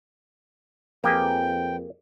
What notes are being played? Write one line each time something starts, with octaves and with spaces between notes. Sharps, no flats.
F2 F3 A#3 G4 G#4 B4 G5